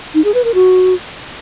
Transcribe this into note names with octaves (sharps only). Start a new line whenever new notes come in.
D#4
G#4
B4
A#4
F#4